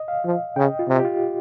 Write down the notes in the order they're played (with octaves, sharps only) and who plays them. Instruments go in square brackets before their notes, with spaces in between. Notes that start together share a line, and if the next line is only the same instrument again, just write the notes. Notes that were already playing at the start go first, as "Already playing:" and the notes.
Already playing: [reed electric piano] D#5
F5
[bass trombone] F3
[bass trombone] C#3 [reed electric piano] G5
[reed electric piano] D#5
F4
[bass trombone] C3 [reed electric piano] G4
[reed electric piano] G4
F4